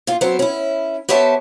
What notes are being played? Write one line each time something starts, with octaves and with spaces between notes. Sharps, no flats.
A#2 F4
F#3 B3 C4 C5
C#4 E4
B3 G4 C5 C#5 E5 A5